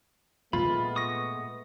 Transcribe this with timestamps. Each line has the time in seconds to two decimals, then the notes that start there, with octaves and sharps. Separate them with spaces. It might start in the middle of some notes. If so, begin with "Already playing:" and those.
0.53 A#2 G#3 A3 B3 F4 B5
0.96 C#6 D#6 A#6